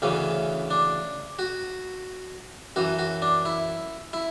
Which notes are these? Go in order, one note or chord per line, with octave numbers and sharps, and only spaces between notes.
D2 C#3 E3 C#4
D4
F#4
F#2 E3 F#4
F#4
D4
E4
E4